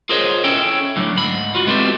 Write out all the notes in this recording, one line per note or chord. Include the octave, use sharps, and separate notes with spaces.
F4 G#4 A#4 C5 C#5 D#5
C#4 E4 A4 C#5 G5
A2 D3 F#3
D2 G#2 B5
F4 F#4
G#3 B3 C4 E4 G4 A4